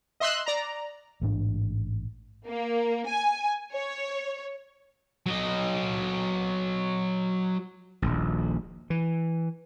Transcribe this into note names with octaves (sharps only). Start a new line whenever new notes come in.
D#5 E5 C6 E6 F#6
D5 A#5
A1 G#2 D4
A#3
G#5
C#5
F#3 D#5
D#1 A#1
E3